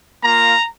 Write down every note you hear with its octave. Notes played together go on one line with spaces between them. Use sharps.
A#3 F4 A#5